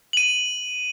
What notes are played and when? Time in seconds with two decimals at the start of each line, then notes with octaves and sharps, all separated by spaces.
0.13 D#7 F#7